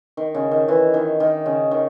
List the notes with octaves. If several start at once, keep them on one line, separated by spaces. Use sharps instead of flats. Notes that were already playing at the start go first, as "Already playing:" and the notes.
D#3
C#3
D#3
E3
D#3
D#3
C#3
D#3